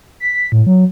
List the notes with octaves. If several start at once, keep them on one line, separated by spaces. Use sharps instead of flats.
B6
A2
F#3